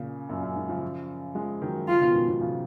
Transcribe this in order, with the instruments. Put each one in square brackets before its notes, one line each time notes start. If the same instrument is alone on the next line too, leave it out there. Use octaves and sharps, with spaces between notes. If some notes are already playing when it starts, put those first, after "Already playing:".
Already playing: [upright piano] A#2 C#3
F#2 A#2
F#2
G#2
C#3 F3
F3 G#3
D#3 F#3
[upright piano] C#3 F3 [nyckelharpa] F4
[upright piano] B2 D#3
G#2 B2
G#2 B2
C#3 F3